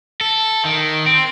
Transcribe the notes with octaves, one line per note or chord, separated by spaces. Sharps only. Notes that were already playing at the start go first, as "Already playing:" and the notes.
A4
D#3
C4